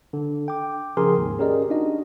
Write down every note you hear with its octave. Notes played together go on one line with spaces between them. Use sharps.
D3
G5 D6
C#3 F3 G#4 A#4 G#5 C6
D#2 G#2
C#4 G4 G#4 A#4 D5 D#5
D4 D#4 F#4 D#5